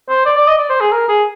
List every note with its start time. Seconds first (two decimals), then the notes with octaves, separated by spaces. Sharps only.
0.09 C5
0.26 D5
0.37 D5
0.47 D#5
0.58 D5
0.70 C5
0.80 G#4
0.92 A#4
1.09 G#4